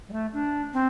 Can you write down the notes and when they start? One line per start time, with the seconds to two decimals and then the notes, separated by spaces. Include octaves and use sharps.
0.09 G3
0.12 A3
0.33 D4
0.73 C4